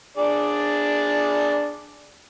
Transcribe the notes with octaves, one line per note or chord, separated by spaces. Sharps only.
D4 G#4 D5